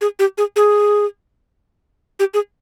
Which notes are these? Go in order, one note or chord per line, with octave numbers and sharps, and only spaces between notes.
G#4
G4
G#4
G#4
G4
G#4